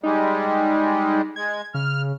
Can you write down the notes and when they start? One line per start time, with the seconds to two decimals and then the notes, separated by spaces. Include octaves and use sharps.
0.03 G3 G#3 D#4
1.36 G#3 G#6
1.74 C#3 F6